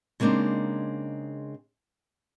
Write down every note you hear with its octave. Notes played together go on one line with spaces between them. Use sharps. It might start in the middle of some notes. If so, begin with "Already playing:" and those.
C#3 G#3 A#3 C4 D4 D#4